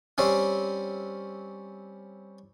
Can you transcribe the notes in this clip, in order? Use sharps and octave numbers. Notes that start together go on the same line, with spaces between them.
G3 C4 C#4